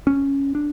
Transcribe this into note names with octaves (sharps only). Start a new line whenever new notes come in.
C#4
D4